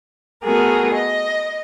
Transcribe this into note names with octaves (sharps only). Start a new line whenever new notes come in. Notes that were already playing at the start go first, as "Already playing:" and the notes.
A3 B3 F#4 G#4 A#4
D#5